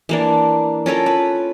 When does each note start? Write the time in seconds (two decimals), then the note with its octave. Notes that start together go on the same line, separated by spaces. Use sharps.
0.09 E3 A#3 D4
0.86 C#4 F4 A4 A#4
1.06 B4